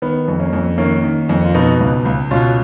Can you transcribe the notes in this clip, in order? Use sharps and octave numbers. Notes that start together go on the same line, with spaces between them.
D#3 B3
F2
A#3 C#4
F2
D#3 A#3 C#4
D#3
F2
F4
B2 B3 D#4
C#2
C#2
B2 C#4 F4